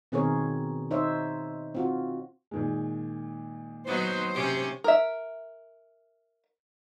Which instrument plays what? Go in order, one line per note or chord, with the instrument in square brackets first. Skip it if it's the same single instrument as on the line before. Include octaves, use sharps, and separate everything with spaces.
[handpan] B2 D#3 C4 G#4 A#4 C#5
D#4 C5 C#5 E5
C4 F4 F#4
[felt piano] A#2 D#3 G#3
[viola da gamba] F#3 B3 D#4 [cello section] C5
[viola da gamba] C3 C#4 G4
[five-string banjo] A#4 E5